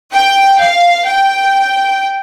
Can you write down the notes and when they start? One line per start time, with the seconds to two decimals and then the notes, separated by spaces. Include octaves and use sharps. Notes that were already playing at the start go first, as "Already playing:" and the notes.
0.12 G5
0.58 F5
1.06 G5